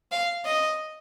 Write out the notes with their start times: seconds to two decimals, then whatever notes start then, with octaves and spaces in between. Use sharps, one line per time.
0.12 F5
0.45 D#5